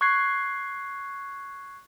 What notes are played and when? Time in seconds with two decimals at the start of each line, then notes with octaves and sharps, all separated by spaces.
0.01 C#6 F#6 G#6 C7